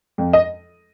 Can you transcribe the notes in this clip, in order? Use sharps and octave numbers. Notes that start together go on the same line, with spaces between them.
F2
D#5